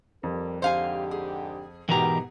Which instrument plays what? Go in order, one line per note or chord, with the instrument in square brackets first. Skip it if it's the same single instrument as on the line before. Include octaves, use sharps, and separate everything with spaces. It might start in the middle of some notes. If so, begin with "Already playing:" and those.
[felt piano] F2 [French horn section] G3 G4 A#4
[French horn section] G#2 D3 G4 [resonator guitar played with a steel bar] C5 F5 G#5
[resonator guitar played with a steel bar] G#4
[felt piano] G#2 B2 G4 [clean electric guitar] E3 A#4 A#5 [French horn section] B3